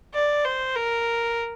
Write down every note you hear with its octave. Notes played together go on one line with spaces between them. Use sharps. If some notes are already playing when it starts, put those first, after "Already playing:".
D5
C5
A#4